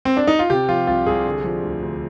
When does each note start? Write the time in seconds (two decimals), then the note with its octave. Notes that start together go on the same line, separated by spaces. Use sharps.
0.05 C4
0.17 D4
0.27 D#4
0.39 F4
0.50 C3 G4
0.69 F3 F4
0.87 C2 F4
1.06 C2 G#4
1.26 D3
1.44 F3
1.63 D2
1.82 D2